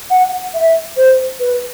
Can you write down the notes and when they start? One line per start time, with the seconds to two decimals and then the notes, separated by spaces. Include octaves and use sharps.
0.10 F#5
0.54 E5
0.96 C5
1.39 B4